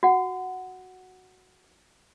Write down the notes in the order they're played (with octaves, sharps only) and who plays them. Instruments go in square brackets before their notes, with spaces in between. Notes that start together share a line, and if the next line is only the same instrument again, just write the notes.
[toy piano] F#4 F#5